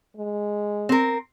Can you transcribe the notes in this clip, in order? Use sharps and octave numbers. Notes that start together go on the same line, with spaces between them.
G#3
C4 A#4